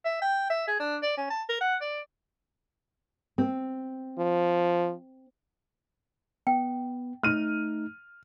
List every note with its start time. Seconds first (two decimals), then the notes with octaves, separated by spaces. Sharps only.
0.05 E5
0.22 G5
0.50 E5
0.68 G#4
0.80 D4
1.03 D5
1.17 C#4
1.30 A5
1.49 A#4
1.61 F#5
1.81 D5
3.38 C4
4.18 F3
6.47 B3 G5
7.23 A3 D#4 F6 D#7